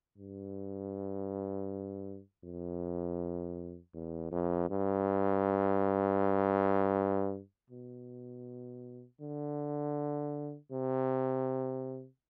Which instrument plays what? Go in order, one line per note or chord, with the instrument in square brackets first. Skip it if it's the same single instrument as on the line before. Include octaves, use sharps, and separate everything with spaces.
[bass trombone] G2
F2
E2
F2
G2
B2
D3
C3